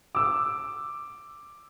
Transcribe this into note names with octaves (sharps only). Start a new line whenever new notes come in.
D6 E6